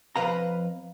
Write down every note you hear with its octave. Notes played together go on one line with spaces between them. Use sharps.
F2 B4 F5 A#5